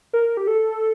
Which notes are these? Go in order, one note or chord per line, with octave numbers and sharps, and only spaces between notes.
A#4
G4
A4